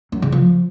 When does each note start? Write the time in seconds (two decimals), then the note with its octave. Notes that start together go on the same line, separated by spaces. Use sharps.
0.12 F#2
0.22 C#3
0.32 F3